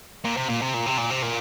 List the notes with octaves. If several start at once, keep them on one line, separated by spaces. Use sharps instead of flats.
A#2
C3
A#2
C3
A#2
C3
A#2
C3
A#2